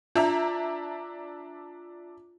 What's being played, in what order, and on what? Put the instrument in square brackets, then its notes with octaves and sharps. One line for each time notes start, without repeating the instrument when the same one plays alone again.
[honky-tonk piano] D4 E5 A#5 [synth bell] F4